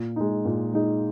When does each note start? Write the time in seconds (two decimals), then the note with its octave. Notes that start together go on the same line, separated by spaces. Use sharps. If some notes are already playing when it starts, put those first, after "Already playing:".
Already playing: A#2
0.16 G#3 D#4
0.45 A#2
0.73 G#3 D#4